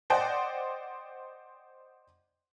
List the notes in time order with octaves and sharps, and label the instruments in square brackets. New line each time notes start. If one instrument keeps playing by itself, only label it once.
[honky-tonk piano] C5 D5 D#5 F#5 G5